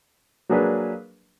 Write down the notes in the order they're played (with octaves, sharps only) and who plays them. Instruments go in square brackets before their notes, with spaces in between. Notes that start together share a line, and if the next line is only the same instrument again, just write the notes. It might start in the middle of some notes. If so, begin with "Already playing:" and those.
[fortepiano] F#3 A#3 D4 G#4 B4